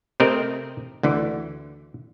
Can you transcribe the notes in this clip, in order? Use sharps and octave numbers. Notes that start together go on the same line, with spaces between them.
C3 A3 C4 A#4 D#5
D2 D3 E3